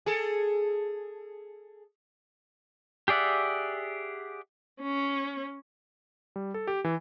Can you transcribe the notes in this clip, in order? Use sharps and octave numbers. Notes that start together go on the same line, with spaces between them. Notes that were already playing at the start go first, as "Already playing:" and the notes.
G#4 A4
G4 G#4 D5 E5 F#5
C#4
G3
A4
G4
E3